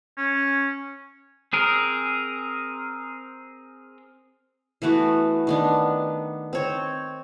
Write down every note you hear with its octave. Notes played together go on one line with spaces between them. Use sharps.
C#4
C4 G#4 A#4
E3 A3 B3 F#4
D#3 B3 D4
C4 C#5